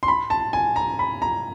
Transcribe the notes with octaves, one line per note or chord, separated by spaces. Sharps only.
C6
B5
A5
G#5
A#5
B5
A#5